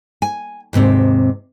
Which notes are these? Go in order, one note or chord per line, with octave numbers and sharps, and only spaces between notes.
G#5
D#2 G#2 C3 C4